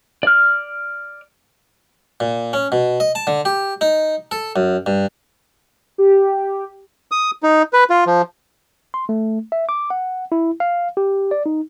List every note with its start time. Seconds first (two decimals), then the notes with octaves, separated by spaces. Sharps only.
0.23 D5 F6
2.20 A#2
2.53 C#4
2.72 B2
3.00 D#5
3.15 A5
3.27 D3
3.45 G4
3.81 D#4
4.31 A4
4.56 F#2
4.86 G2
5.98 G4
7.11 D#6
7.43 D#4
7.73 B4
7.90 F4
8.07 F3
8.94 C6
9.09 A3
9.52 E5
9.69 D6
9.90 F#5
10.32 E4
10.60 F5
10.97 G4
11.31 D5
11.46 D#4